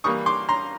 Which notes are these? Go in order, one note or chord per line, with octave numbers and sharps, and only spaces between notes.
E3 G3 A#3 C#6 D#6
C6 D6
A#5 C6